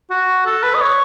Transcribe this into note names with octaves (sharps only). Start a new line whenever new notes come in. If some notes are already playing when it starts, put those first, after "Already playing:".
F#4
A4
B4
D#5
C#5